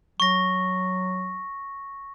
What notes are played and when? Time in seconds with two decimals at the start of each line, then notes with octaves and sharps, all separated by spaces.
0.20 F#3 C#6 A#6